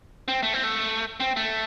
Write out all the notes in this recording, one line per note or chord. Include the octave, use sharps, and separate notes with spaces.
C4
A3
C4
A3
C4
A3